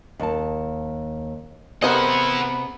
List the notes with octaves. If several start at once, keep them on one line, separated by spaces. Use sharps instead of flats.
D#2 A5
C3 B3 E4 G#4 A#4 C5 D#5 F#5